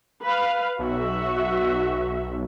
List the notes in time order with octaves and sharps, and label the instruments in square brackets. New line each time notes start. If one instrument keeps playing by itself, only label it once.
[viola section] B4 F5
[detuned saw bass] B1 [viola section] F#4 E5